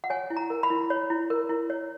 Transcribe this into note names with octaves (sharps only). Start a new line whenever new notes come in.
F#5
C#5 G#5
E4
A#5
A#4
B5
E4
C#5
E4
A#4
E4
C#5